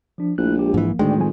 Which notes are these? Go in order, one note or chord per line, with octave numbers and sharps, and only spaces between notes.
F3 D4
A#1 A3 E4 F#6
G#3 A#3 G4
G#2 E3 F3 A#3
D2 A2 D#3 G#3 D5 G5
F2 F#3 G#5